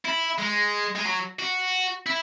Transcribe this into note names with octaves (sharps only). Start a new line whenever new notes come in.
E4
G#3
G#3
F#3
F#4
E4